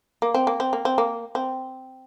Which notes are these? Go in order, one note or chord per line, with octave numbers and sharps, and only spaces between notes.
A#3
C4
A#3
C4
A#3
C4
A#3
C4